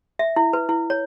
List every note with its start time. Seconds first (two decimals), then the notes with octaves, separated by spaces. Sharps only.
0.19 E5
0.36 E4
0.53 B4
0.69 E4
0.90 C#5